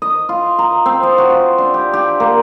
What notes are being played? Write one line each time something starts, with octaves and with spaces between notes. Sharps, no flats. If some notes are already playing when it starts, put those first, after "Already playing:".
D#5
F4
A#5
C4
D#5
F#4
F4
D4
G4
G4
A#3